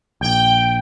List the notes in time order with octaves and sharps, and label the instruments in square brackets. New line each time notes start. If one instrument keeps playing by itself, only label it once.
[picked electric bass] A#1 [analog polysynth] G5